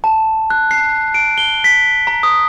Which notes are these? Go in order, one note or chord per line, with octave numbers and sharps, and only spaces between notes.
A5
F#6
C7
D7
G7
B6
A#5
D#6